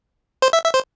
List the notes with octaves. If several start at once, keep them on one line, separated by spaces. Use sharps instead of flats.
C5
E5
E5
C5